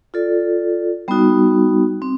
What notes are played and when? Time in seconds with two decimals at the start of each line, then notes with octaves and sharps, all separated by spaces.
0.14 F4 A4 D5
1.08 G3 B3 D#4 F#4
2.02 C4